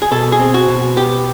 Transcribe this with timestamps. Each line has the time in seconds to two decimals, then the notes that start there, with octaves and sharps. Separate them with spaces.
0.02 G#4
0.11 B2 A4
0.32 G#4
0.40 C4
0.54 F#4
0.68 B2
0.96 B3 G4